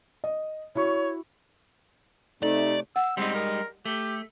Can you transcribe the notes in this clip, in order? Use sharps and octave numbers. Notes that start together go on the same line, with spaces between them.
D#5
E4 F#4 C#5 C#6
C3 A3 D#4 D5
F#5 E6
G3 G#3 C4 D#4
A#4
A3 G4